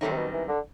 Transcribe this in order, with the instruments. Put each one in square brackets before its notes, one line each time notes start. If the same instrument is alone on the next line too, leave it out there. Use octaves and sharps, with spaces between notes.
[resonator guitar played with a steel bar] F#2 D#3 G3 C4 D#4 [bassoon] A2
[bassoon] C3
B2
E3
D3